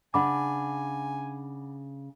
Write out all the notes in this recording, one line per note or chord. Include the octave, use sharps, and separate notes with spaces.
C#3 D4 F#5 G#5 B5 D6